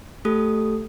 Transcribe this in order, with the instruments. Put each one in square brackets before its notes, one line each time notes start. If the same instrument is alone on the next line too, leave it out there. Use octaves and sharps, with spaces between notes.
[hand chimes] A3 G4 A4 D#6